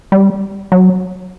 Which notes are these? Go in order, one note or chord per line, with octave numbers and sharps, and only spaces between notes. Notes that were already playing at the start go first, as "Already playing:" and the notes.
G3
F#3